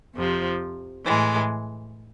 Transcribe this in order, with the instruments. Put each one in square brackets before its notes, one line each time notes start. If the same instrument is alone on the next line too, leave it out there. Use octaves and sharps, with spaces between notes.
[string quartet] F2 C3 F3
A2 E3 G#3